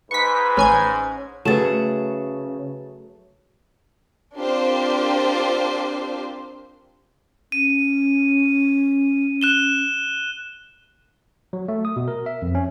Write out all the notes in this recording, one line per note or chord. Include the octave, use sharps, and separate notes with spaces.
G#2 B4 C#6 B6
A1 C#4 G#5 G#6
C#3 F#3 A3 G#4 B4 A6 E7
C4 D4 F4 G4 A#4 C5
C#4 D#7
F#6 E7 G7
F#3
A3
D#6
B2
A#4
E5
F2
C#4